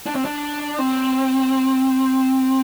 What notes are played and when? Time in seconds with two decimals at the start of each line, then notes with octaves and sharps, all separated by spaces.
0.06 D4
0.15 C4
0.25 D4
0.79 C4